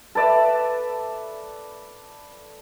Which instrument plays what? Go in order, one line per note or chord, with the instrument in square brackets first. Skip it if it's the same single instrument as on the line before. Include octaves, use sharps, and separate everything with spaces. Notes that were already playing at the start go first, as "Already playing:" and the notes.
[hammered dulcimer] A4 B4 D5 E5